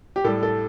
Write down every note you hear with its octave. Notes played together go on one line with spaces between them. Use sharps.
G4
A2 G3 A4
A4